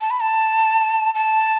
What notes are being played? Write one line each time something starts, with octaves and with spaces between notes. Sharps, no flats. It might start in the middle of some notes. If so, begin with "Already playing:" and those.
A5
B5
A5
A5